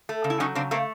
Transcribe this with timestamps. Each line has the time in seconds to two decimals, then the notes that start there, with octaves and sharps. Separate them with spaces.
0.09 A3
0.24 C#3
0.30 E4
0.40 F#3 C#4 D#4
0.55 C#3 C4 D4
0.71 A3 A#3 C4